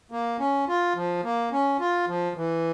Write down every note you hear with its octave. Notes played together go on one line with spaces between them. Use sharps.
A#3
C#4
F4
F3
A#3
C#4
F4
F3
E3